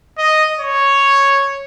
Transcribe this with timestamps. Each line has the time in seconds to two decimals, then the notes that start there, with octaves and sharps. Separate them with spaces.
0.18 D#5
0.59 C#5